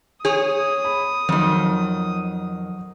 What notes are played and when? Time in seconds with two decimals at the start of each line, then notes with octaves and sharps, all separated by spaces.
0.25 G#4 C#5 D#6
0.85 B5
1.29 F2 D#3 F#3